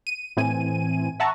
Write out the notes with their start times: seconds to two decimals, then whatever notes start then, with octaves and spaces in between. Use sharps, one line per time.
0.07 D#7
0.37 A2 E3 C4 G#5 D#7
1.20 E5 F#5 A5 A#5 C#6 E6